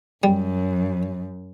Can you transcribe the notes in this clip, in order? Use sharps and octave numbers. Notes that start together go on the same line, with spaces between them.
F#2 G3